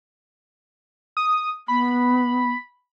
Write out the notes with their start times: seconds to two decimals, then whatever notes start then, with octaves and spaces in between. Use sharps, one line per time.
1.17 D#6
1.68 B3 B5